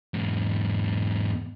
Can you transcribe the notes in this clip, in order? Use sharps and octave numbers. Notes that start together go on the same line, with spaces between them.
E2 G#2